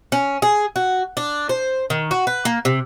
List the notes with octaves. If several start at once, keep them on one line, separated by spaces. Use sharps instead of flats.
C#4
G#4
F#4
D4
C5
D#3
F#4
B4
A#3
C3